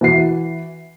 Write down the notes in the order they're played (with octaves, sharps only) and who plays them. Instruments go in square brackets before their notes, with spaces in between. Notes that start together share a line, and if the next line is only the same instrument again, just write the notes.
[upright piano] E3 F#4 C7